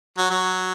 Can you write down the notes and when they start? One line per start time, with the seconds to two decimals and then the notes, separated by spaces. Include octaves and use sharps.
0.18 F#3
0.30 F#3